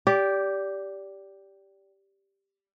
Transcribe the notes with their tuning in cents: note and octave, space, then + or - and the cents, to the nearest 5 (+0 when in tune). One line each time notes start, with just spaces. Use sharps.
G4 +0 D5 -20